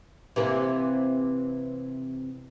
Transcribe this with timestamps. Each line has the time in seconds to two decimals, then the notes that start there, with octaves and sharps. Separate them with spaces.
0.36 C3 E3 A#3